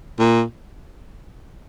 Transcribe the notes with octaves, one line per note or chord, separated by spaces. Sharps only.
A#2